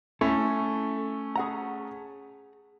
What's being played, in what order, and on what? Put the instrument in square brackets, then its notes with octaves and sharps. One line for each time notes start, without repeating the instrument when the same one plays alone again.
[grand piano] A3 C#4 [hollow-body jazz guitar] E4 A4
[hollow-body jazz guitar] G#4 F#5 A#5